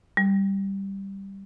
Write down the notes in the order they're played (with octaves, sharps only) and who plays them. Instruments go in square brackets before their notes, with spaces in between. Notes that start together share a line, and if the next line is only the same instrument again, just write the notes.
[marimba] G3